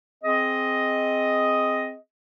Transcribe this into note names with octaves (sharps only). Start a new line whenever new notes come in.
C4 G#4 D#5